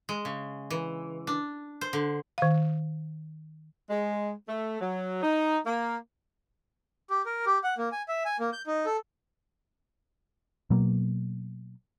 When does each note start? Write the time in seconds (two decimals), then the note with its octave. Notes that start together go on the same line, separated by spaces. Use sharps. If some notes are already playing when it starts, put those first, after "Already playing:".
0.09 G#3
0.25 C#3
0.70 E3
1.27 D4
1.81 C5
1.93 D3
2.38 D#3 F5
3.90 G#3
4.49 A3
4.81 F#3
5.23 D#4
5.66 A#3
7.10 G4
7.26 A#4
7.46 G4
7.64 F#5
7.78 A#3
7.92 G#5
8.08 E5
8.25 G#5
8.40 A#3
8.53 G6
8.67 D#4
8.86 A4
10.70 B2 F#3 A#3